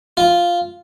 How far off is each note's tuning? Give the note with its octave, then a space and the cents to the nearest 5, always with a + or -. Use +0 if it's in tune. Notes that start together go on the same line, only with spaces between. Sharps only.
F4 +0